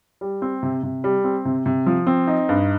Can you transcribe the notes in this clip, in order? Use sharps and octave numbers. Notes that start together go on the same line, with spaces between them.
G3
C4
C3
C3
G3
C4
C3
C3
F3
C4
D#4
G2